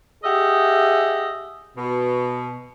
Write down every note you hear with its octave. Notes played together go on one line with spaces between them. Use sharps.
G4 G#4 D#5 E5 F#5
B2